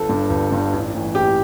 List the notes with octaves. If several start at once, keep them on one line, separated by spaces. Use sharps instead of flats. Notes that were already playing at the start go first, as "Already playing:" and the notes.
Already playing: G1 A4
G2 D3
G1
G2 D3
A1
A2 E3
A1 G4